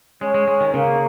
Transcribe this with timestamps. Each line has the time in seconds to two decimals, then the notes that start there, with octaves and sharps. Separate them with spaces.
0.21 G#3 C#4
0.34 G#3
0.48 G#3
0.61 D#3
0.74 C#3 A#3